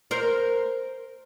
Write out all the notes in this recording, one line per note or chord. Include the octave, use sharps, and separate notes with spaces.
A#4 C5